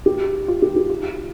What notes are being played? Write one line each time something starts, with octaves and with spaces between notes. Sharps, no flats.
G4
F4
G4
G4
F4